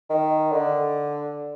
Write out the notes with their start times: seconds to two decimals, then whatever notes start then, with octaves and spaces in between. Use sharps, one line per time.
0.10 D#3
0.52 D3